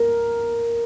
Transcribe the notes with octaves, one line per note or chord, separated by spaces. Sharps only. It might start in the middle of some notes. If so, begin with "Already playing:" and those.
Already playing: A#4